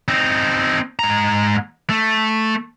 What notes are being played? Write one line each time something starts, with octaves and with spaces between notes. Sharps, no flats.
C4 D#4
G#2 A#5
A3